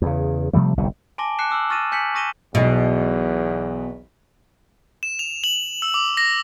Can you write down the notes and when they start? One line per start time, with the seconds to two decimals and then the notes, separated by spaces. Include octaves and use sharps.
0.02 E2 C#3
0.53 C3 F3 G3 A3
0.77 G1 C2 F#2 C3
1.18 G#5 A5 C6 D6 A#6 G7
1.39 A5 D6 F#6 C7 C#7 E7
1.50 D6 E6 F6 F#7
1.70 C#6 F6 A6 A#6 D#7 E7
1.92 G#5 G6 B6 C#7 F#7
2.14 C#6 D#6 A#6 D#7 E7 G7
2.55 B1 E2 B2 D#5
5.03 E7
5.19 F7
5.44 F#7
5.82 E6
5.94 D6
6.17 A#6